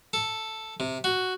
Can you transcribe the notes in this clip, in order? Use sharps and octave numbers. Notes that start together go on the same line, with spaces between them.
A4
C3
F#4